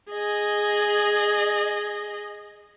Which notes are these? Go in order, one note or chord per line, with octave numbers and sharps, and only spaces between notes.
G#4 D#5